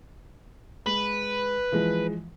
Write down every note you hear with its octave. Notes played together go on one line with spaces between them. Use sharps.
G#3 B4
E3 F3 G#3